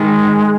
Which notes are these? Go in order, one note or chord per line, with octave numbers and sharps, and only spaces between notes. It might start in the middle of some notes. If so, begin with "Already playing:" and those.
Already playing: D#3 G#3